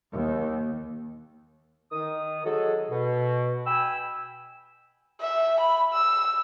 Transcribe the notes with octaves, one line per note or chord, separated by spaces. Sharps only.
D#2
D#3 D#6
F#3 G#3 F#4 A4
B2
G5 G#5 B5 E6
E5
B5
E6